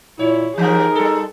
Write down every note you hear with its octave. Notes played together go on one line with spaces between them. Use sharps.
A#2 E4 C#5
E3 F3 D#4 G4 G#4 A#4
G3 A4